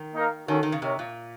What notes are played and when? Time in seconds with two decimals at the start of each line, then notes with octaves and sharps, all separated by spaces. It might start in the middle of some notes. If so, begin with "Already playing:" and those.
Already playing: D#3
0.14 A#3 D#4 A#4 F5
0.48 D#3 C#4 F#4 A4
0.63 D#3
0.72 C#3
0.82 C3 D#4 A#4 C#5
0.99 A#2